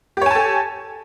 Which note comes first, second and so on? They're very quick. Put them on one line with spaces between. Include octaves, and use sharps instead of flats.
G4 C#5 G#5 A5 A4